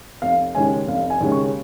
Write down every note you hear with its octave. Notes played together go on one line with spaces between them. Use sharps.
F1 F5
D#2 C#3 G#3 C#4 G#5
F1 F5
G#5
D#2 C#3 G#3 C#4
C#6